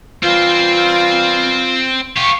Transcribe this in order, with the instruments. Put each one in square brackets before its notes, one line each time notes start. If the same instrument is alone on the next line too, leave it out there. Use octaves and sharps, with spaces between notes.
[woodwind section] E3 G3 F4 [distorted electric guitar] C4 C5
[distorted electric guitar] F4 G4 [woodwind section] C#6